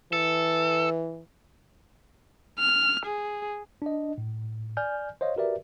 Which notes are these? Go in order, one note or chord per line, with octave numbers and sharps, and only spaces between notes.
E3 A4
F6
G#4
D4 D#5
A2
D5 G#5 F6 G6
C5 C#5 D#5 F5
F#4 G4 A#4 B4 D5 E5